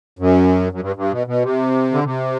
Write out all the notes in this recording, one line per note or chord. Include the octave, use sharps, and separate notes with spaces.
F#2
F#2
G2
G2
B2
B2
C3
D3
C3